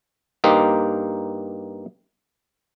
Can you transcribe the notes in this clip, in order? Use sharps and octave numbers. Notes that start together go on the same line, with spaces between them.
G2 A#3 D#4 G4 C5